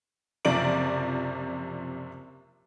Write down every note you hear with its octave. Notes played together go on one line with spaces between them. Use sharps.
F#1 C3 F3 D5 D7 F#7